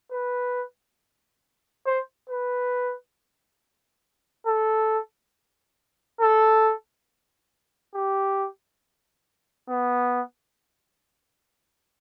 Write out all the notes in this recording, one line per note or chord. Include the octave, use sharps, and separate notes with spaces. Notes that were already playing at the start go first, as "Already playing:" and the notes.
B4
C5
B4
A4
A4
G4
B3